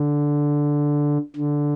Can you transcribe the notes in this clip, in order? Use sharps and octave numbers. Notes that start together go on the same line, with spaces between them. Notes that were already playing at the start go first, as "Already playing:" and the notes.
Already playing: D3
D3